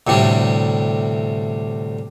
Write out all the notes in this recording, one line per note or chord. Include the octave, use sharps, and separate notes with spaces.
D2 A2 C3 G3 D4